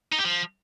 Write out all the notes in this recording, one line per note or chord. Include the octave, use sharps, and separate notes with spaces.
D#4
G4
F3